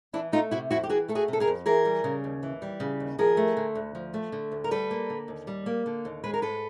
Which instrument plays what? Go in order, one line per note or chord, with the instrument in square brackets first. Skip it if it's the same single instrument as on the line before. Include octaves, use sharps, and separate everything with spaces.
[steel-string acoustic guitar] E3 D4 E4
A3 D#4 F4
C3 E4 F#4
F2 E4 F#4
G4
E3 F#4 G#4
A3 A4
F#4 G#4
C3 A4
G#4 A#4
F2
E3 G#4 A#4
G3
C#3
D#2
E3
G3
C#3
D#2
F3 G#4 A#4
A3
D3
D2
F3
A3
D3
D2
A#4
G3 A4 B4
A#3
D3
D#2
G3
A#3
D3
D#2
G#3 B4
A#4
G#2 A4 B4